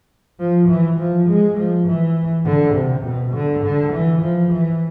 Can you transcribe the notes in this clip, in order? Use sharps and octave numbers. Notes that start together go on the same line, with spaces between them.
F3
E3
F3
G#3
F3
E3
D3
C3
B2
D3
D3
E3
F3
E3